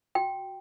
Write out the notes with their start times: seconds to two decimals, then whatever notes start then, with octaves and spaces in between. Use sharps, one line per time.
0.15 F#4 G5